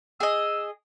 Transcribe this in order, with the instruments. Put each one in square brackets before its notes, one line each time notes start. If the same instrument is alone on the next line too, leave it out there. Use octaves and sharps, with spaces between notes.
[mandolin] G#4 D#5 [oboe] E6